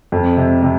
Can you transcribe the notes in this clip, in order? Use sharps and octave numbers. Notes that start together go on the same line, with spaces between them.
F2
C3
C3